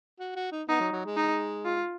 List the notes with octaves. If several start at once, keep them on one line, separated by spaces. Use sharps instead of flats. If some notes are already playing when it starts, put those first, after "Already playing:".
F#4
F#4
D#4
B3 D#4
F#3
F#3
G#3
D#4
F4